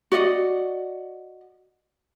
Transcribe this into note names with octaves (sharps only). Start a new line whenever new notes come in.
F#4 D5 D#5 F#5